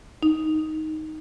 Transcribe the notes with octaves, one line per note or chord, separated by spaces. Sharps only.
D#4